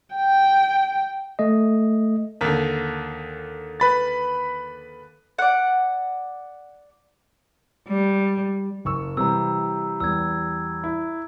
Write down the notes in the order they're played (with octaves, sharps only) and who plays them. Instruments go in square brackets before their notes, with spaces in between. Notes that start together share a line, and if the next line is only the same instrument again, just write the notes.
[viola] G5
[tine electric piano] A3 D#5
[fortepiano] D#2 D3
[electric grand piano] B4 B5 A6
[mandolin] D5 F#5
[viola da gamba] G3
[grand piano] F#1 C#6 E6
[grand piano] C3 E3 G3 [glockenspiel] A#5 E6
[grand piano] E2 G3 [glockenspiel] E6 G#6
[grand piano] E4